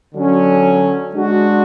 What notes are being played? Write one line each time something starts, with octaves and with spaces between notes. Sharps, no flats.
D3 F#3 C#4
G#3 D4 F#4